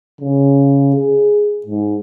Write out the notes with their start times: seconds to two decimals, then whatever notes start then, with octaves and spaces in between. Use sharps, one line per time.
0.21 C#3
0.96 G#4
1.66 G#2